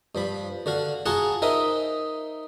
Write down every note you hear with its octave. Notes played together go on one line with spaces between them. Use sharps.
G2 F3 B5
D3 F#4 F5
F4 F#4 G#4 F#5 A5 A#5
D#4 A#4 C5 E5 D#6